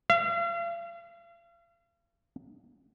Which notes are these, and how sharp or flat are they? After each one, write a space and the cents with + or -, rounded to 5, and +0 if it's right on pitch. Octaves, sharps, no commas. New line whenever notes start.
F5 -40